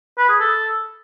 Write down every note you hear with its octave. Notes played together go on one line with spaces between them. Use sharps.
B4
G#4
A4